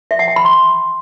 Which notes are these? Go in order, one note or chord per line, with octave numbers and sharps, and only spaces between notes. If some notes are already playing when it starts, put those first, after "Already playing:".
E5
F#5
G5
B5
C6